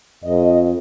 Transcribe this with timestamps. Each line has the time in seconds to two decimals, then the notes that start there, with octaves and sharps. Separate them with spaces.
0.24 F2 D#5